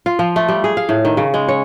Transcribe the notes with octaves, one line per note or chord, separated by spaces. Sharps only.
F4
F3
A3
G3
G#4
F5
A2
D#3
C#3
G#3
C#5